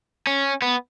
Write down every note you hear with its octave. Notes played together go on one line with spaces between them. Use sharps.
C#4
B3